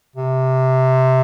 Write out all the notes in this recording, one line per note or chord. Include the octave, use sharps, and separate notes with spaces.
C3